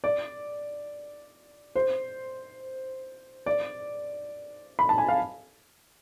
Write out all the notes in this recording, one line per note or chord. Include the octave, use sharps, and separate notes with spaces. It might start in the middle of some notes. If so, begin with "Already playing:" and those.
D5
C5
D5
B5
A5
G#5
F5